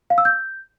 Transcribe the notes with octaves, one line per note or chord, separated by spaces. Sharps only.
F5
E6
G6